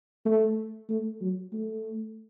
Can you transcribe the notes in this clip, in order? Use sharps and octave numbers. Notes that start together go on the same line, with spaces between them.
A3
A3
F#3
A3